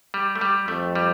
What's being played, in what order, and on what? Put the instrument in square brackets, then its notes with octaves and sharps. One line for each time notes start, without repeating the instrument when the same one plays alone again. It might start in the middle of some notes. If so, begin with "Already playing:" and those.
[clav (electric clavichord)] G3
A3
G3
[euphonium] F2 [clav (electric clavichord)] A3
[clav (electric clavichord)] G3